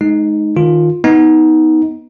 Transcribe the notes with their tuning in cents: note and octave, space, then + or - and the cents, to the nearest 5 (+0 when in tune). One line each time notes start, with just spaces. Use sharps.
G#3 +35 D#4 +0
D#3 +0 F4 +10
B3 +0 D#4 +20